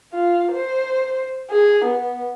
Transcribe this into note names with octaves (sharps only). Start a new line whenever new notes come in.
F4
C5
G#4
B3